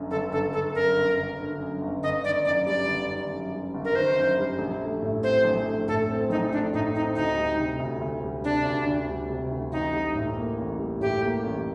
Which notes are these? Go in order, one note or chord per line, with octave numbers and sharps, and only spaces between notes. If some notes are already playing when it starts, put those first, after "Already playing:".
Already playing: G1 F#2 D3
G1 A4
G1 A4
D3 A4
F#2 A#4
G1
G1
D3
F#2
G1
G1 D#5
D#3 D5
F#2 D5
G3 D5
G1
D#3
F#2
G3
G1
A#4
D#3 C5
F#2
G3
A#1
A3
A2
C4 C5
A#1
A3
A2 A4
C4
A#1 D#4
A3 D4
A2 D#4
C4 D#4
D2 D#4
G3
C3
D2
D2
G3
C3 D4
D2
D2
G3
C3
D2
A1 D#4
G3
A2
A#3
A1
G3
A2 G4
A#3
A1